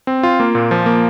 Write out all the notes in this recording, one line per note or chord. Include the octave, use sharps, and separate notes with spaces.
C4
F4
A#3
A#2
F3
A#3